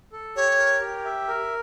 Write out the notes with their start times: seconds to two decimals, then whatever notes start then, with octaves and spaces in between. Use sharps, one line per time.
0.12 A4
0.36 G4 C#5
0.58 A#4
0.81 G4
1.05 E5
1.28 A#4